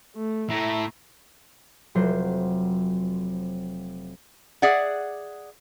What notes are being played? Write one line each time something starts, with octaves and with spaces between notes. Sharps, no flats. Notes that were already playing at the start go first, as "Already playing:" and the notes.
A3
A2 E5 A#5
F1 F#3 C5
G#4 D5 E5 F#5